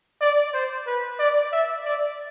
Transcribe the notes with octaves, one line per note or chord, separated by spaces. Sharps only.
D5
C5
B4
D5
E5
D5